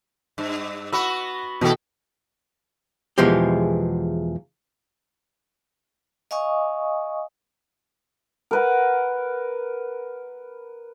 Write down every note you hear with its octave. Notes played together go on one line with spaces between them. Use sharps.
G2
B3 F#4 F#5 B5 E6
B2 D#3 A4 G5
E2 B2 E3 F3 G#3 G4
D#5 F5 G#5 C#6 D#6
A#4 B4 F#5